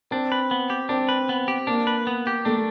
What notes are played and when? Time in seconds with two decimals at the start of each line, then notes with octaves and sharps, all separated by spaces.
0.11 C4 D4
0.32 B4
0.51 B3
0.70 G4
0.89 C4 D4
1.09 B4
1.29 B3
1.48 G4
1.67 A#3 D4
1.87 B4
2.07 B3
2.27 G4
2.45 A3 D4